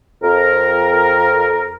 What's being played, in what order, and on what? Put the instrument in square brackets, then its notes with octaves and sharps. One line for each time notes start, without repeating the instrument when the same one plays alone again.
[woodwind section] F2 A#4